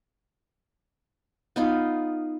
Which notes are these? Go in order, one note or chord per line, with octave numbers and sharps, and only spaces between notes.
B3 D#4 F4